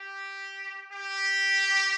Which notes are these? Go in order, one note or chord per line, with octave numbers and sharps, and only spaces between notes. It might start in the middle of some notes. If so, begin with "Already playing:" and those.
Already playing: G4
G4